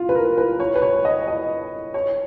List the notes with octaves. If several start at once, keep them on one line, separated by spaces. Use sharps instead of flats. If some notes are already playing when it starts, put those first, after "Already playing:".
Already playing: F4
B4
A#4
B4
C#5
B4
C#5
D#5
D#5
C#5